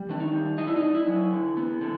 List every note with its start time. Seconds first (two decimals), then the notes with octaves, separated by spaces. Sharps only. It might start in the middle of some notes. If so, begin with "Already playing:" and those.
Already playing: G3
0.09 D#3 D4
0.20 D#4
0.33 G3
0.58 D4 D#4
0.67 E4
0.76 D#4
0.82 D4
0.95 E4
1.07 F#3
1.32 D3
1.57 B3
1.81 D3